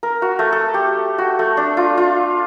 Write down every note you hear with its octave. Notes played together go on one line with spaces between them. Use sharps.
A#4
F#4
A3
A4
G4
F#4
A3
D4
F4
F4